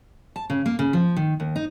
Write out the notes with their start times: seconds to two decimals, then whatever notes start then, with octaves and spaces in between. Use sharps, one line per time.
0.36 A5
0.50 C#3
0.66 A#3
0.79 C#3
0.93 F3
1.16 D#3
1.40 D#2
1.56 D#4